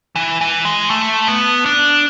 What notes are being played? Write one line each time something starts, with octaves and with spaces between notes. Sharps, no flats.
E3
E3
G#3
A3
B3
D4